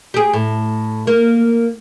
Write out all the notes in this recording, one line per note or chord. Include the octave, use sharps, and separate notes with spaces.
G4 G#4
A2
A#3